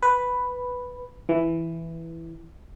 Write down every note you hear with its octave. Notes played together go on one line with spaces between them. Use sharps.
B4
E3